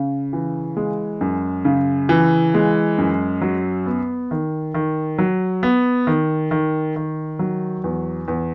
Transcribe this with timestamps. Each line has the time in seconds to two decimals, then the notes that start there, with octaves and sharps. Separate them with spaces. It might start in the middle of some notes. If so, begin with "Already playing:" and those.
Already playing: C#3
0.33 E3
0.77 G#3
1.21 F#2
1.65 C#3
2.09 E3
2.54 G#3
2.98 F#2
3.42 F#3
3.86 B3
4.31 D#3
4.74 D#3
5.19 F#3
5.63 B3
6.07 D#3
6.51 D#3
6.96 D#3
7.39 F#3
7.84 E2
8.28 E2